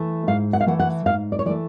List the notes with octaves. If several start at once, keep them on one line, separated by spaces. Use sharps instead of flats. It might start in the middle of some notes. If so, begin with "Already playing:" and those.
Already playing: E3 A3
G#2 F5
F#5
F5
E3 A3 F#5
F#5
G#2 F5
D5
C#5
E3 A3 D5